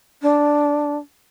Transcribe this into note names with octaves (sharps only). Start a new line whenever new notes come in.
D4